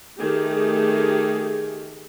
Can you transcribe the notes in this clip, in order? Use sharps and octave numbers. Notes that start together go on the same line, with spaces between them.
D#3 A3 G4 G#4